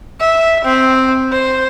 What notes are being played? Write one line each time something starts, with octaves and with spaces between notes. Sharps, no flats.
E5
C4
C5